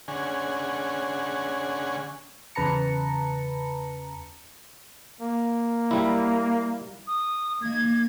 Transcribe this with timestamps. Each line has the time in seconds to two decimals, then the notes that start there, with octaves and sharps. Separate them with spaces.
0.08 D3 C#4 G#4 F#5 G#5
2.55 E2 C#3 B4 A5 A#5 C#7
5.21 A#3
5.91 G3 E4
7.07 D#6
7.62 D#3 A#3 G#6